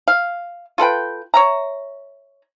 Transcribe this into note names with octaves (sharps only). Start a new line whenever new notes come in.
F5
F4 A4 B4 G5
C#5 E5 A#5